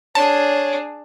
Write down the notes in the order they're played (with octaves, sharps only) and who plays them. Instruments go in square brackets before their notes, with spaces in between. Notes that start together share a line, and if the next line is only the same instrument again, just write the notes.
[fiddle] D4 G#4 [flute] C#5 [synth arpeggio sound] A5